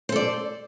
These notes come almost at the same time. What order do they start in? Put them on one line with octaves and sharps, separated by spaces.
C5 A4 D5